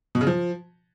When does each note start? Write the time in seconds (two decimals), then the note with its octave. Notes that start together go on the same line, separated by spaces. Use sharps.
0.15 B2
0.21 C#3
0.27 F3